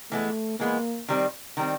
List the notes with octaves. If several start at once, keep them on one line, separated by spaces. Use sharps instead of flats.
E3 G#3 A3 B3
E3 G#3 A#3 B3
D#3 G3 C4
D#3 G3 C4